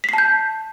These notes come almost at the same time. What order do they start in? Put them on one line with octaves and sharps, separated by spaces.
B6 C7 A5 G6